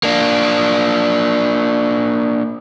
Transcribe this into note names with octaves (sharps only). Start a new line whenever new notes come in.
A#3 D4